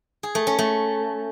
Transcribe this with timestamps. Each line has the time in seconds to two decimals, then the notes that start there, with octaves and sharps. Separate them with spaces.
0.23 G#4
0.35 A3
0.47 C#4
0.59 A3